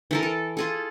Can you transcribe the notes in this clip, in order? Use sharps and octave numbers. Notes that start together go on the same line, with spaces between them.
E3 A4 A#4
A4
F4 G#4 A4